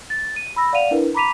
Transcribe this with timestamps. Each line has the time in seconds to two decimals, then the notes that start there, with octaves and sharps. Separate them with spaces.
0.10 A6
0.36 D#7
0.56 B5 E6 A#6
0.73 D5 F5 F#5 D#7 F7
0.91 D4 E4 A#4 B4
1.14 A#5 B5 D6 B6 D#7 F7